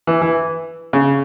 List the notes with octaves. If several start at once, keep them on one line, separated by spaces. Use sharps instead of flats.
E3
E3
C#3